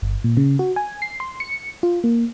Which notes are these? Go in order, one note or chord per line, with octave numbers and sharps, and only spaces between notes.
G1
A#2
C#3
F#4
G#5
C7
C6
C#7
F4
A#3